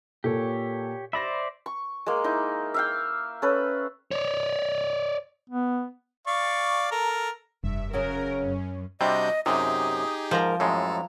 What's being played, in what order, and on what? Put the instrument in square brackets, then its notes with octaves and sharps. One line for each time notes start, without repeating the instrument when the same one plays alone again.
[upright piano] A#2 A4 [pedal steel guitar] G4 C#5
[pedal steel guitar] C5 D5 E5 [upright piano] B5 A#6
[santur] C#6
G#3 A#3
D#4 E4
E5 F5 G5
C#4 A4 B4
[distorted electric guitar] C#5 D5
[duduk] B3
[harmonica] D5 F5 C#6
A4 A#4
[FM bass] F1 [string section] G2 [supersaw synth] E5
[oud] C#3 F#3 [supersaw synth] C#4 [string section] A#4
[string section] F#2
[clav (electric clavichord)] C3 G3 C4 [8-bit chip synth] D4 F#4 G6 [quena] D#5
[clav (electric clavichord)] F#2 C3 [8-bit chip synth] D#4 G4 G#4 [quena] D#6
[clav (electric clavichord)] G#2 A#5 [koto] F3 [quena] A#4
[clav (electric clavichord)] F#2 A2 G#3 [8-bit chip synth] A4 [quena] A#5